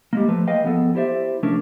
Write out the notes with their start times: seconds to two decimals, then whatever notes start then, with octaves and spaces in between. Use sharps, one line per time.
0.13 G3 G#3 A#3
0.28 F3 A3 B4
0.47 G#4 B4 D#5 F5 G5
0.64 F3 B3 A4
0.95 E4 G4 C5 D5 E5
1.43 C2 F3 A3 C#4 D4 A#4